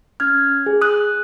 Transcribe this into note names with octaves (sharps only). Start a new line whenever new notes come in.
C#4 F6 G#6
G#4
D#6 F#6